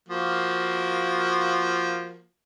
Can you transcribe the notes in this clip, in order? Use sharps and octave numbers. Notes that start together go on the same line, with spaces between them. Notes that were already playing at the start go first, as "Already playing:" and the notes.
F3 A#3 F#4